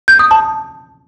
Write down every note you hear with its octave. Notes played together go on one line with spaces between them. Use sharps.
G6
D#6
A5